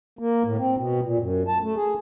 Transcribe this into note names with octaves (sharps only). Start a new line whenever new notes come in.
A#3
A2
C4
B2
A#2
F#2
A5
A3
G#4